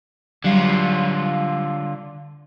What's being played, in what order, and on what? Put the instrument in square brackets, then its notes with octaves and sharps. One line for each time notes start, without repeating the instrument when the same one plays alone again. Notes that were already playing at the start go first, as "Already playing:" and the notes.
[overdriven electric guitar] D3 F4 [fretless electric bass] F#3 [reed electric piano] G3